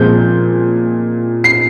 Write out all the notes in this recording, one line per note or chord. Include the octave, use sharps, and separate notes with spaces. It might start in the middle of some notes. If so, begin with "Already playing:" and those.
Already playing: A#2 F3 G#3 C4 G6
C7